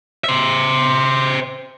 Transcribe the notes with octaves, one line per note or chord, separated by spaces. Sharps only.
C5 E5